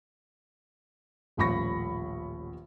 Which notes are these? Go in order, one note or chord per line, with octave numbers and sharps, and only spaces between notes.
D#1 A1 F3 B5 C#6 A#6